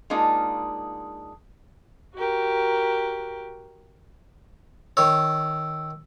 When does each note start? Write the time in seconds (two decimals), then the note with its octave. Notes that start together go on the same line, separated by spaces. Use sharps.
0.10 G#3 A#3 D4 D#4 F4
2.14 F#4 G4 A#4
4.97 D#3 C#5 E6